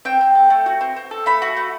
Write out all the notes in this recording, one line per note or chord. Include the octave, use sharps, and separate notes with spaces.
C4 G5
C4
A4
A3
F#4
C4
C4
A4
A3 B5
F#4
A3